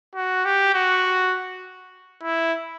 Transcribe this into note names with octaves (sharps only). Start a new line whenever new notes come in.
F#4
G4
F#4
E4